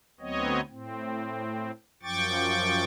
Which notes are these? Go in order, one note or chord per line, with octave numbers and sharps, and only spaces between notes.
D2 F#3 B3 C4 C#5 D#5
A2 C4
F#2 F3 G5 C#6 D6 A6